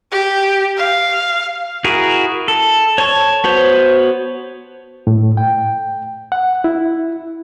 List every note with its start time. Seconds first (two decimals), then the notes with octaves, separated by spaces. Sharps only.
0.12 G4
0.77 F5
1.84 E4 F#4 G#4 A#4
2.48 A4
2.98 C#5 A5 C#6
3.44 B3 F#4 C5 C#5
5.07 A2
5.37 G5
6.32 F#5
6.64 E4